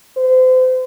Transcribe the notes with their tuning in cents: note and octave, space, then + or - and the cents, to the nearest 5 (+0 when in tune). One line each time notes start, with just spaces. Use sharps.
C5 -35